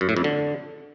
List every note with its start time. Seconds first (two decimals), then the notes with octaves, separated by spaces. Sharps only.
0.01 F#2
0.09 A2
0.17 F2
0.24 D3